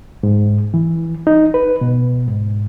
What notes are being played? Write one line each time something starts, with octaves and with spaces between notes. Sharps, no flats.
G#2
E3
D#4
B4
B2
G#2